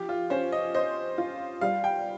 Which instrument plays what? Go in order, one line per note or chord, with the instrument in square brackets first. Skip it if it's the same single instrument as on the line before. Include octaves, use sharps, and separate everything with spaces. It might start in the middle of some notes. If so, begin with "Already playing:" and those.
Already playing: [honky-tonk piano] F3 [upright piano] G4
[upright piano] F4
[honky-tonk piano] C#4 [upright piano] C5
[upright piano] D#5
[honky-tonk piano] C5 [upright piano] D#5
[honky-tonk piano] F4
[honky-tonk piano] G3 [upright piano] F5
[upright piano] G5